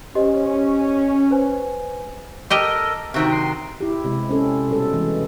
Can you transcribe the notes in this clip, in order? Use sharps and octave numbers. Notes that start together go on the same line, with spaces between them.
C#4 G4 C5 D#5
B4 C5 G#5
G4 A4 A#4 D#5 G5
C3 D#3 F#3 C4 F#4 E5
C6
E4 G4
C3 G#3
C4 C#4 A4
B2 G3 A4
E3 G#3